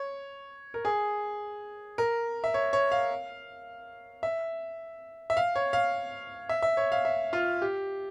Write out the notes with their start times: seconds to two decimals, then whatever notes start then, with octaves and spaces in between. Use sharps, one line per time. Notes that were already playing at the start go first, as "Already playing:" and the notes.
Already playing: C#5
0.74 A#4
0.85 G#4
1.98 A#4
2.44 E5
2.54 C#5
2.73 C#5
2.92 F5
4.23 E5
5.30 E5
5.37 F5
5.56 C#5
5.73 F5
6.49 E5
6.62 E5
6.77 C#5
6.92 F5
7.05 E5
7.33 F4
7.62 G4